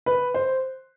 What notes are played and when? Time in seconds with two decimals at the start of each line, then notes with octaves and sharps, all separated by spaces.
0.06 B4
0.34 C5